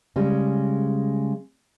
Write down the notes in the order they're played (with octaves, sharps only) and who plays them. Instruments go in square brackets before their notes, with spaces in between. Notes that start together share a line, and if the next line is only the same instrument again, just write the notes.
[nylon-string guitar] C#3 G3 G#3